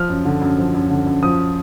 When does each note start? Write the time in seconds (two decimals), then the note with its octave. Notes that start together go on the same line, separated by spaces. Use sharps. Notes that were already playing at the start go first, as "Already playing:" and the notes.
Already playing: F3 F6
0.09 F#2
0.25 D3
0.42 F#2
0.58 F3
0.74 F#2
0.90 D3
1.06 F#2
1.22 F3 D#6